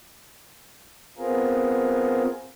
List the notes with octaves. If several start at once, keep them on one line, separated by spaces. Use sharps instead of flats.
B3 C4 F4 G#4 A#4